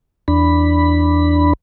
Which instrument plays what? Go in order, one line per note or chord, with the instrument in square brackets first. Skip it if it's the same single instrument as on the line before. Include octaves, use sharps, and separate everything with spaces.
[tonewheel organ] E2 D4 B5